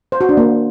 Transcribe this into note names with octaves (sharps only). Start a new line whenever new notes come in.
C5
F#4
D4
A#3